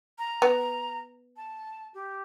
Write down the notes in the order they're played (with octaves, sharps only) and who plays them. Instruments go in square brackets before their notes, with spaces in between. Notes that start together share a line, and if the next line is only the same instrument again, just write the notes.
[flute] A#5
[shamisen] B3
[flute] A5
G4